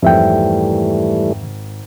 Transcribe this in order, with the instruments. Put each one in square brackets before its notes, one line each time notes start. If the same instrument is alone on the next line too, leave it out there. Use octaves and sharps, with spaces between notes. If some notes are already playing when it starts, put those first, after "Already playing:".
[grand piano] G#1 [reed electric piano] F2 E5 G5 [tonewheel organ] E3 G3 A3